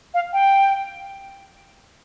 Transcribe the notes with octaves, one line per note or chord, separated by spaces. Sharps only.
F5
G5